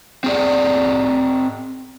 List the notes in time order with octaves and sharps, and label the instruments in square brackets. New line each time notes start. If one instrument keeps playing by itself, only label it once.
[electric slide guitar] C4 G#4 D5